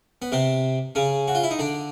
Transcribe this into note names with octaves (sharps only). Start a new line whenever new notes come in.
B3
C3 C4
C#3 C#4
F#4
F4
E4
D#4
D3 D4